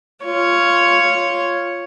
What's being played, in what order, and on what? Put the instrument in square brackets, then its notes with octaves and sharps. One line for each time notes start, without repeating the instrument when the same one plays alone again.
[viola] F4 C#5